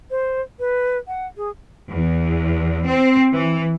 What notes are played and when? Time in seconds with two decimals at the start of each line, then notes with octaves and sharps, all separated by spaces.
0.11 C5
0.59 B4
1.08 F#5
1.37 G#4
1.89 E2
2.86 C4
3.34 E3